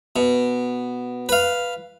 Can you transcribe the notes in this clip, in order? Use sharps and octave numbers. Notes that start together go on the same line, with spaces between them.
B2
B4 F5